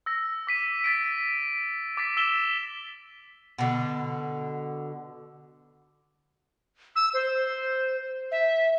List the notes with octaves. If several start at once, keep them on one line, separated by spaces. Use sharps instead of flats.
E6 A#6
D6 B6 D#7
A6 B6 D7
D6 A6 B6
E6 B6 E7 G7
B2 D3
E6
C5
E5